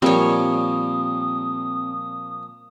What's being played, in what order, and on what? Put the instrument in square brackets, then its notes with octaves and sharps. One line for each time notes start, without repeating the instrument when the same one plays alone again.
[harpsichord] A#2 F3 A#3 [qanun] G3 C#5 [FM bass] C4 [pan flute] D#6